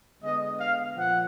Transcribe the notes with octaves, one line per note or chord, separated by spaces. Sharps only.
D3 G#3 B3 D#5
F5
A#2 F3 F#5